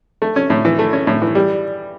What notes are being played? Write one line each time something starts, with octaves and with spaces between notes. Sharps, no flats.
A3
C#4
A2
E3
A3
C#4
A2
E3
G3